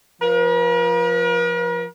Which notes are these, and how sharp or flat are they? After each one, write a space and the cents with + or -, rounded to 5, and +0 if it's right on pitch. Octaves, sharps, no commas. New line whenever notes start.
F3 +0 A#4 +45